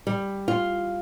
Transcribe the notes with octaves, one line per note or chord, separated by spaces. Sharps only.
G3
F4